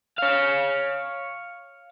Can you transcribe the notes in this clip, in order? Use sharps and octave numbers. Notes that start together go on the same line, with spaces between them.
C#5 F5